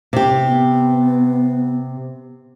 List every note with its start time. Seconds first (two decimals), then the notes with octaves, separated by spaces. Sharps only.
0.13 C3 G4
0.46 B3